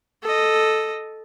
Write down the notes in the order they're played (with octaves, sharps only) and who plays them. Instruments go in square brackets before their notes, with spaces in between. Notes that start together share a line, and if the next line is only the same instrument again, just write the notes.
[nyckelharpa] A4 D#5